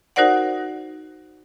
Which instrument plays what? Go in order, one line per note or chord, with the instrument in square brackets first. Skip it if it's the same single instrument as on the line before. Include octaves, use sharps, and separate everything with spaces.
[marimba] D#4 F#4 A#4 C5 D5 F#5